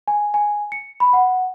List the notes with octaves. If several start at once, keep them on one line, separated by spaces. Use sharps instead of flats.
G#5
G#5
C#7
B5
F#5